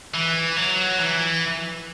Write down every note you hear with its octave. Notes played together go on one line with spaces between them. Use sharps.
E3
F#3
E3